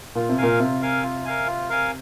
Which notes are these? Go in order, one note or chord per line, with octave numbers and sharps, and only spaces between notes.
A#2 F4
C3
A#2 A#4 F5 G#5
C3 F4
A#4 F5 G#5
F4
A#4 F5 G#5
F4
A#4 F5 G#5